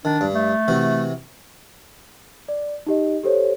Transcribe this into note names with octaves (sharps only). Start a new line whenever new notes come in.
D#3 D4
G2
A3
C3 E3 F#4
D5
D#4 G4 D#5
G4 A4 C5 C#5